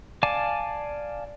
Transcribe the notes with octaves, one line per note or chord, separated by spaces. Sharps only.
D5 F5 G#5 A5 D6